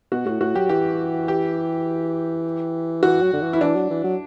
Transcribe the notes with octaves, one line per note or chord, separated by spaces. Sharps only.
B2 F#4
A2 F#4
A2 F#4
F#3 G4
E3 G4
G4
E3 F#4
F#3
D3
E3
E4
E3 D4
F#3
E3
F#3